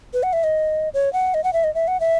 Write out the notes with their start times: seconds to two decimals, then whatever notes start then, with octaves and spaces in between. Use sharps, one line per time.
0.14 B4
0.23 F#5
0.33 E5
0.44 D#5
0.94 C#5
1.13 F#5
1.34 D#5
1.44 F#5
1.53 E5
1.64 D#5
1.74 E5
1.88 F#5
2.00 E5